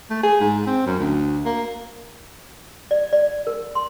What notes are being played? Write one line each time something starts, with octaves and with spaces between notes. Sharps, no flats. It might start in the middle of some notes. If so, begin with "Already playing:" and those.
A3
G#4
G#2
C4
F#2
D2
A#3
D5
D5
A#4
C6